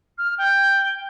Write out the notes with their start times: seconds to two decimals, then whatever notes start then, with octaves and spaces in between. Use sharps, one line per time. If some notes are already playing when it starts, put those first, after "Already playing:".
0.17 F6
0.38 G5